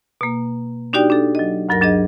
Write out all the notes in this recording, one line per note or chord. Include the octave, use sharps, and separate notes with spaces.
B2 A#3
D4 D#4 F#4 G4 D5 G5
D4 A4
F#3 D#5
D2 G2 F#3 A#4 A#6
F#3 D4 G#4 D#5